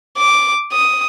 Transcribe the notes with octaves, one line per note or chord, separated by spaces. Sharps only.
D6
D#6